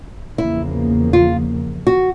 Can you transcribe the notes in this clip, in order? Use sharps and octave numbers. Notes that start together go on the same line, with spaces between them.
E2 C#3 F3 A#3 E4
F4
F#4